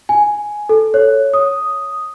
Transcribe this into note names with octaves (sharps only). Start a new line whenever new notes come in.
G#5
A4
C#5
D#6